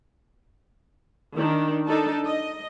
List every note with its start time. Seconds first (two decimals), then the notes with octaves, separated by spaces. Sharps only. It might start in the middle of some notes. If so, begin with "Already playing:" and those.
1.36 D#3 D4
1.86 D4 D#4 A4 A5
2.24 D#5